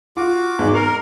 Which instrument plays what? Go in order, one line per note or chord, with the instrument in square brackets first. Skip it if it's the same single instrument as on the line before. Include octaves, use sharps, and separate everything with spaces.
[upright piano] F4 [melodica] F#4 D6
[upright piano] G#1 E2 G#2
[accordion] A#4 [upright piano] C7 F7